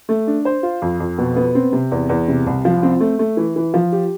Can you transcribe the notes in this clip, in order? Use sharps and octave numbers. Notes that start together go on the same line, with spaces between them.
A3
D4
C5
F4
F2
F2
B2
B3
C4
C3
E2
E2
C3
C2
F3
C4
A3
A3
E3
E3
F3
G4